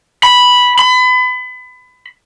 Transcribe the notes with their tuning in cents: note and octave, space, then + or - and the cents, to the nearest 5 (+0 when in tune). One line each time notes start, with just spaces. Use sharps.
B5 -5
B5 +30